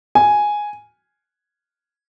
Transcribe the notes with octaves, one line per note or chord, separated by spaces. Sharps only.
G#5